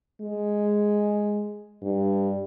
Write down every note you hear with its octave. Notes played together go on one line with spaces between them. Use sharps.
G#3
G2